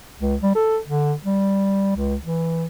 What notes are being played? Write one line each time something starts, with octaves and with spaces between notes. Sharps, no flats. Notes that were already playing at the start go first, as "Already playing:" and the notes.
C#2
G3
A4
D3
G3
C#2
E3